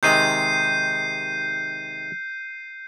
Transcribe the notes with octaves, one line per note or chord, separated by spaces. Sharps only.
C3 D#3 G#3 G6 C7 D#7